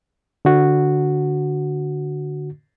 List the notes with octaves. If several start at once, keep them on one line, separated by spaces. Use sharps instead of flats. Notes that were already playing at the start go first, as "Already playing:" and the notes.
D3 F#4